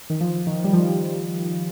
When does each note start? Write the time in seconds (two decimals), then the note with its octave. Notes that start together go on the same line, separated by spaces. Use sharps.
0.10 D#3
0.21 F3
0.47 D#3
0.64 G3
0.73 F3